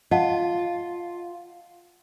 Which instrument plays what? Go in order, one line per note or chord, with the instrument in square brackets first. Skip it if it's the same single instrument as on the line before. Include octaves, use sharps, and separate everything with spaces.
[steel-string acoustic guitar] F4 [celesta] D#5 F#5 A5